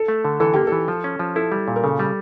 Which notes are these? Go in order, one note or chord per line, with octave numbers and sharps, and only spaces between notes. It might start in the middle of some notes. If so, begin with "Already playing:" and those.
Already playing: A4
A3
D3
E3 A4
A#3 G4
A4
E3
F3
C#4
F3
E4 A4
G3
A#2
A#4
C#3 A4
G3